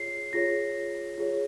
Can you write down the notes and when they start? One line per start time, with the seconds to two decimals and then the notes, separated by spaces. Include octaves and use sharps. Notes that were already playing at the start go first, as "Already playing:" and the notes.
Already playing: F4 G#4 C#5 C7
0.33 F4 G#4 C#5 A#6
1.18 F4 G#4 C#5